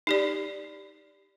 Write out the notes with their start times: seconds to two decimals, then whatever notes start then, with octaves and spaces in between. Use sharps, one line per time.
0.07 D#4 G4 D5